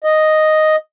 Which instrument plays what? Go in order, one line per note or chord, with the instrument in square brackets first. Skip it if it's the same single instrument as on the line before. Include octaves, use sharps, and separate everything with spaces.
[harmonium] D#5